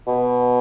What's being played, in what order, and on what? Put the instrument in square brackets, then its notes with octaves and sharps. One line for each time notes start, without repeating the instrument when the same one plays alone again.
[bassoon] B2